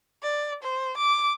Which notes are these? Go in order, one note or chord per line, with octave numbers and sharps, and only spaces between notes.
D5
C5
D6